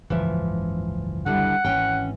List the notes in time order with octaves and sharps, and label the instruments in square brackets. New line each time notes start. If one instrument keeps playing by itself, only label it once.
[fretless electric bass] F#1 C#2 G#2 [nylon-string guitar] E3 F3 E5
[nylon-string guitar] D3 G3 E4 [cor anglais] F#5
[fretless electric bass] G#1 E3 [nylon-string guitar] C#4 G5